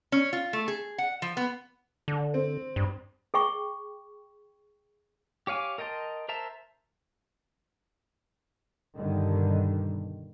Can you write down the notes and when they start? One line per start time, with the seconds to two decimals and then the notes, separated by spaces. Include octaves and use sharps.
0.12 C#4
0.33 F4
0.53 A3
0.68 G#4
0.98 F#5
1.22 F3
1.37 B3
2.08 D3
2.34 C4
2.76 G2
3.34 G#4 G5 C#6
5.47 G4 C#5 F5 G#5 D6
5.78 A#4 D#5 G5 A5 C6
6.29 A#4 C5 E5 A5 A#5
8.98 G2 B2 D3 D#3 G3